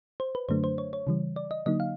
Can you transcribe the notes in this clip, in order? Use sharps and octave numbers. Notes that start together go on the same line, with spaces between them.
C5
B4
F#2 D3 F#3 A3 D4 C5
C5
C#5
C#5
C#3 E3 G3
D5
D#5
D3 F#3 A#3 D#4 D#5
F5